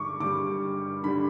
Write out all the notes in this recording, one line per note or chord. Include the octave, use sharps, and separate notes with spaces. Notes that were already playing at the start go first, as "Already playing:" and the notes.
Already playing: G2 D3 G3 C#6 D6
G2 D3 G3 D6
G2 D3 G3 B5